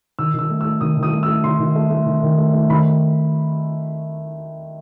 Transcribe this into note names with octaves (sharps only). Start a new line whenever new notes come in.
D#3 E6
D#3 E6
A3
E6
A3
D#3 D#6
D#3
D#6
A3
E6
A3
D#3 C6
D#3
A3
A3
D#3
D#3
A3
A3
D#3 B5